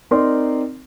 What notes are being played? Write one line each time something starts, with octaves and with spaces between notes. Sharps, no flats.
C4 D#4 A#4 D5 C6